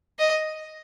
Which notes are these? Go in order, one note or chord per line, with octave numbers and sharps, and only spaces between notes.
D#5